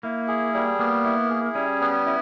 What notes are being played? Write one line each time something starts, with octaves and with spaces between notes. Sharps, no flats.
A#3 E4
G#4
G3
A#3 B3
E4
G#4
G3 C#4
B3
E4